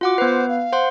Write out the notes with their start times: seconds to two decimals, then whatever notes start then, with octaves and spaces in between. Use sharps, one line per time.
0.01 F4 F#4 F#5 D6
0.18 B3 B4 C5
0.48 F5
0.73 C5 F#5 C6